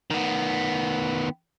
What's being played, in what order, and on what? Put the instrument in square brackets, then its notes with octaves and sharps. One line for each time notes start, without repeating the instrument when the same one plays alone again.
[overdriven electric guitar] D#3 B3